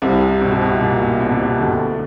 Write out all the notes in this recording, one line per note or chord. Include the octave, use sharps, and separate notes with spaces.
C2 C3
B2
C3
B2
A#2
B2
C3
B2
D2 D3